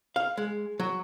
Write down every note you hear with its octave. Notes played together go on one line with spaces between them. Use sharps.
F5
G#3
F#3